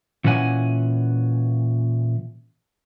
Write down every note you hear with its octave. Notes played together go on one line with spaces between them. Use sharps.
A#2 E3 C#4 F#5 G#5